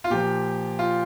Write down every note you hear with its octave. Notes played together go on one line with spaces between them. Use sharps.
F4
A#2 F3 G4
F4